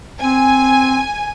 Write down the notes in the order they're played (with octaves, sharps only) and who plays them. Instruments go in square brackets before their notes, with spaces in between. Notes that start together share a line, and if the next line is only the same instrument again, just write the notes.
[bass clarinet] C4 [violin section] G#5